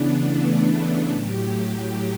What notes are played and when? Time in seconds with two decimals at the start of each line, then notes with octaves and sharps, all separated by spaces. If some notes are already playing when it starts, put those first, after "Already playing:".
Already playing: C#3 E3 B3 D4
0.18 A3
0.64 B3
1.09 A2 F#3 G4
1.55 G4